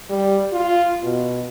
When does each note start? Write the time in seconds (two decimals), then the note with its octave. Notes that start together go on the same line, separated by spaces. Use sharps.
0.10 G3
0.53 F4
1.03 B2